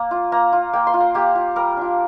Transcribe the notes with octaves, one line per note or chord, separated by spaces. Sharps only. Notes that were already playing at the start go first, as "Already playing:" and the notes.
Already playing: A#3
F4
A#3 A#5
F4
A#3 G5
C6
F4
A#5
A#3 G4
F4
G3 A#4
D4 F4